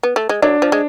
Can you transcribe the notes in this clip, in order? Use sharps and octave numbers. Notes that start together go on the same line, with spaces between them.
B3
A3
G#3
F#3 D4
F3
G#3